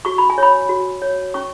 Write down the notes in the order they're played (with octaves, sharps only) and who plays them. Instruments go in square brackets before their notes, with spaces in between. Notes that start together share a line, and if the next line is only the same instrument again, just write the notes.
[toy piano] F#4 C#6
B5
G#5
C#5 B5
F#4
C#5
C#4 C#6